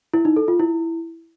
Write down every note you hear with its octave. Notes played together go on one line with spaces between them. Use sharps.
E4
D#4
A4
F4
E4